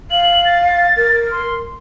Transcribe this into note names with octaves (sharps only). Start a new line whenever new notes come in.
F5 F#7
A6
A#4
C6